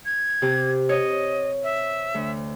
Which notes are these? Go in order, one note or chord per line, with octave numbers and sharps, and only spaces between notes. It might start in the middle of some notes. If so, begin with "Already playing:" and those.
G#6
C3 G4
C#5 D#5
E5
D2